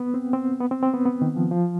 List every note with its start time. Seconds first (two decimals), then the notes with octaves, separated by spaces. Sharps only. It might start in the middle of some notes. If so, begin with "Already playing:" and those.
Already playing: B3
0.14 C4
0.33 C4
0.60 B3
0.71 C4
0.83 C4
0.94 B3
1.06 B3
1.22 D#3
1.36 F3
1.51 F3